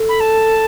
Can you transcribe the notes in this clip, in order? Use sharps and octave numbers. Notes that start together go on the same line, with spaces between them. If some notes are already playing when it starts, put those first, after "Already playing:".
Already playing: A4
B5
A5